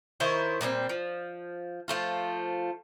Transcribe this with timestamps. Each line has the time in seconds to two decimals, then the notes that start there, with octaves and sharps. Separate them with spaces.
0.20 D#3 E4 C5 C#5
0.61 A#2 G3 A#3 C4
0.89 F3
1.88 F3 A3 F4